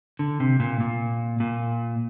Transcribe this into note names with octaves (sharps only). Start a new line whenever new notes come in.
D3
C3
A#2
A#2
A#2